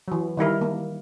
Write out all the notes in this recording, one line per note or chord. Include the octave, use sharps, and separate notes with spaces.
E3 F#3
D#3 G3 E4 A#4
A#3